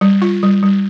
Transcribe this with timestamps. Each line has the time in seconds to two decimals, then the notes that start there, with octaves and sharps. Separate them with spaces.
0.01 G3
0.22 F4
0.43 G3
0.63 G3